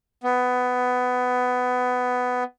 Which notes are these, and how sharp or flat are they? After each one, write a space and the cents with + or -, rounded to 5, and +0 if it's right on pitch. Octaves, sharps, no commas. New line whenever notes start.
B3 +15